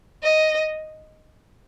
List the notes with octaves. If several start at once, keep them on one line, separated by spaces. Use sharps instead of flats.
D#5